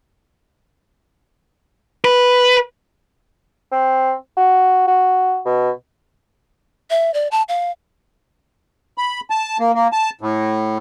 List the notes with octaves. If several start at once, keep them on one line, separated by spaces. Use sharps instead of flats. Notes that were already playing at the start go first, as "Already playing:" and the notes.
B4
C4
F#4
F#4
B2
E5
D5
A5
F5
B5
A5
A#3
A#3
A5
A2